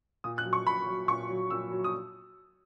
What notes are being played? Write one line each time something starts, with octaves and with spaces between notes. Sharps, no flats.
A#2 D#6
F#6
F#3
C#6
A#2 B5
F#3
A#2 C#6
F#3
A#2 E6
F#3
D#6